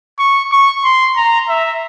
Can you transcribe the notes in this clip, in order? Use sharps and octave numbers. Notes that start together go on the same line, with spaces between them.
C#6
C#6
C6
A#5
E5